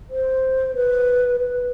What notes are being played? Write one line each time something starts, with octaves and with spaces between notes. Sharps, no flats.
C5
B4
B4